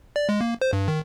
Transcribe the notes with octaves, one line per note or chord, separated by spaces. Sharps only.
D5
G#3
A#3
C5
G2
D#3